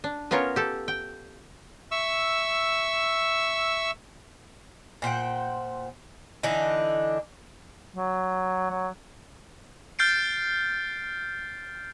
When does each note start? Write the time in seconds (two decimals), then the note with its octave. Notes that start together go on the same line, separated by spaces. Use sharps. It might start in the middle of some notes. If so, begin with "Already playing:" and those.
0.04 D4
0.31 B3 C#4 F4 A#4 C#5
0.56 G4 A4
0.88 G5
1.91 E5 C#6 E6
5.02 A#2 C5 F#5 G5
6.43 D3 E3 D4 D#4
7.96 F#3
8.70 F#3
9.99 F6 G6 A6 C7 D7